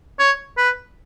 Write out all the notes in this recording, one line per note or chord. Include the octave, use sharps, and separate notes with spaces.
C#5
B4